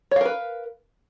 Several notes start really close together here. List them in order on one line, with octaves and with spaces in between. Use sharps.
C#5 F5 A#4 B4